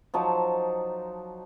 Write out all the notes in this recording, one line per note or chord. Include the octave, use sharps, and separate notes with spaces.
F3 F#3 D#4 A5